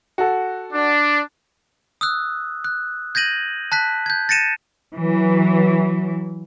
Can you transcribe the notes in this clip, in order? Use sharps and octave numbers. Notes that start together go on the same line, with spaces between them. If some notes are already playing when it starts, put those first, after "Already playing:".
F#4 A4
D4
D#6 E6 F#6
F#6
G6 G#6 A#6 D#7 F#7
A5 F#6 B6
G6 G#6
A6 A#6 C#7 D#7 E7
E3 F#3